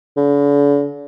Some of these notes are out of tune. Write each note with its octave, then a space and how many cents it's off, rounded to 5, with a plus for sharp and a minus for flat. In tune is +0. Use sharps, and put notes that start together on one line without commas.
D3 -45